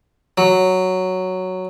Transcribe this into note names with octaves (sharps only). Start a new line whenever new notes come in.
F#3